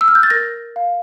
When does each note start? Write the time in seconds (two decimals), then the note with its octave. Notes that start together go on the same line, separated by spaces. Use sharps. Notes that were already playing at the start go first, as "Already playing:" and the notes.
0.01 E6
0.08 F6
0.15 G6
0.23 A6
0.30 A#4 A#6
0.76 F5